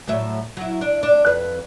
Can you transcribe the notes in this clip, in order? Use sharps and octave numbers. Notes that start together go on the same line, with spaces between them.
A2 F#3 E5
F#3 E4
D4
D4
F2 B4